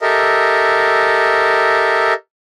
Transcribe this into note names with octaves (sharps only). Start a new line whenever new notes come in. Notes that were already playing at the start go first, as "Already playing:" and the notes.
G4 A4 A#4 D#5 E5